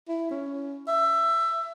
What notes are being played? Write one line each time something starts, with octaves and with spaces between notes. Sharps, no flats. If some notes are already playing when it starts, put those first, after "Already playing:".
E4
C#4
E5